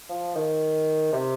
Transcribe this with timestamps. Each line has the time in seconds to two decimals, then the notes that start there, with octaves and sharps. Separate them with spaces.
0.10 F3
0.35 D#3
1.13 C3